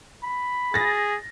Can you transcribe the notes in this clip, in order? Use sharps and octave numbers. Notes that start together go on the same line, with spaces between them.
B5
G#4 A6 A#6